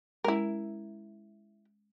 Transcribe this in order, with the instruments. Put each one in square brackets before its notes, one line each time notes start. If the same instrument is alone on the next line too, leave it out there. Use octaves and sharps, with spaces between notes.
[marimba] G#3 C#4 [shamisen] E4 A#4